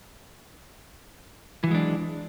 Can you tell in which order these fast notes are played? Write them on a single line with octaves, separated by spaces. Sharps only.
E3 F#3 G#3 D4